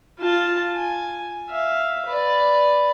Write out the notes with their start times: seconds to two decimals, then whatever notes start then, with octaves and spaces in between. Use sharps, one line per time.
0.19 F4 A5
0.75 G#5
1.50 E5 F5
2.06 B4 D5